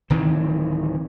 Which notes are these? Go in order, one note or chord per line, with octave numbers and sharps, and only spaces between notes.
D1 D#3 E3 C4